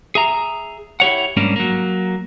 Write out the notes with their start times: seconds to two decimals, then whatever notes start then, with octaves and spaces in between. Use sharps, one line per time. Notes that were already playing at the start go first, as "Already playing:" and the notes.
0.15 G#4 E5 A#5
1.00 E4 G4 C#5 F#5
1.37 G#2 G3 A#3 C#4 D4
1.56 F#3 A#3